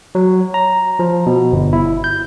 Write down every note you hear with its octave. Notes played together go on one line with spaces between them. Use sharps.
F#3
A#5
F3
B2
G1
E4
G6